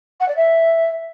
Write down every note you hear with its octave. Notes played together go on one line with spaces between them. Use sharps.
F#5
D5
E5